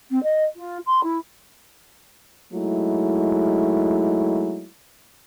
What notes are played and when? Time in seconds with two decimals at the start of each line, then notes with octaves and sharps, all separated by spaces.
0.10 C4
0.23 D#5
0.56 F4
0.86 C6
1.03 E4
2.53 F#3 G#3 A3 D#4 E4